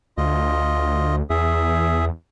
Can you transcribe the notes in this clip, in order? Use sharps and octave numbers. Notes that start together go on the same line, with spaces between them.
D2 F4 D#5
E2 G#4 E5